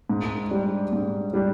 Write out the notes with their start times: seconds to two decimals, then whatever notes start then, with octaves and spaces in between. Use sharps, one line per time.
0.09 G#2
0.50 G3 D4
0.93 G#2
1.34 G3 D4